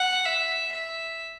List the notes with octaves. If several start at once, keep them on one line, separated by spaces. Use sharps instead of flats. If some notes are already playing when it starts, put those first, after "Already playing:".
Already playing: F#5
E5
E5